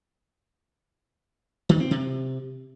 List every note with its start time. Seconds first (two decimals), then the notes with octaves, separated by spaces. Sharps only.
1.69 D#3
1.80 C4
1.91 C3